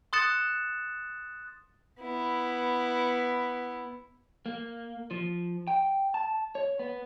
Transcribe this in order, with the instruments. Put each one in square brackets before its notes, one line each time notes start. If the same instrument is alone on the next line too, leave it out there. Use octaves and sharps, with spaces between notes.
[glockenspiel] C6 D#6 F#6 A6 C#7 E7
[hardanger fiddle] B3 E4
[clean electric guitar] A#3
F3
G5
A5
C#5
B3